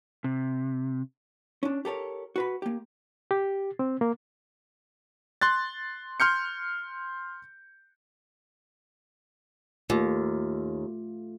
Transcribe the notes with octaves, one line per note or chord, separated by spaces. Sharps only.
C3
C#4 D4
G4 A4 A#4 C#5
F#4 B4 B5
A#3 G4
G4
C4
A#3
C6 F#6 A6
C6 F6 G6 C#7
D#2 A3 F4